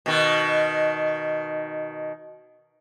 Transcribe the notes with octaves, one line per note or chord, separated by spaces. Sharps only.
B2 D#3